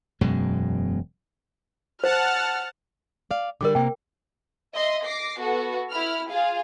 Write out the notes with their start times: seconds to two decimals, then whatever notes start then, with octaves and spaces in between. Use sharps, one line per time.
0.21 E1 F#2 B2 G#3
2.04 C5 F#5 A5 F6
3.31 D5 F5
3.61 D3 G3 A#4 D5 D6
3.75 C3 A#3 G5
4.74 D#5 E5 C6
5.04 D6 A#6 C7
5.40 B3 F#4 A4
5.91 E4 B5 F6
6.29 F4 G#4 F5